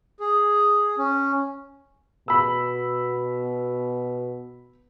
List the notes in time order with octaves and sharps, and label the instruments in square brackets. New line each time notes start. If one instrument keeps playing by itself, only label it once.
[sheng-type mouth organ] G#4
C#4
[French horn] B2 [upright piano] B5 E6